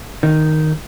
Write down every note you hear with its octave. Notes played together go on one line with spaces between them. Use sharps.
D#3